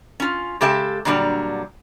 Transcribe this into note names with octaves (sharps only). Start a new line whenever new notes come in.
C#4 F4
C#3 G#3 G4 A4 E5 A5
A#2 D3 F#3 G3 D4